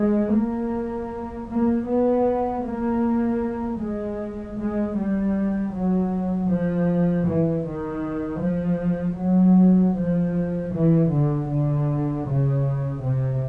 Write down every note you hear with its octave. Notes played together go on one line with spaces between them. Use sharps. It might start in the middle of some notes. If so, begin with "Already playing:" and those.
Already playing: G#3
A#3
A#3
B3
A#3
G#3
G#3
G3
F#3
F3
E3
D#3
F3
F#3
F3
E3
D3
D3
C#3
C3